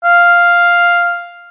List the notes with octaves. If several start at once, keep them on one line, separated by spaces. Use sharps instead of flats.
F5